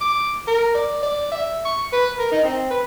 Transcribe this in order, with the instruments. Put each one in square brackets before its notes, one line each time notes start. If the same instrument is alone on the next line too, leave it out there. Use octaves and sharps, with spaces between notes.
[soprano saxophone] D6
A#4
D5
D5
E5
C#6
B4
A#4
D#4
C4
B4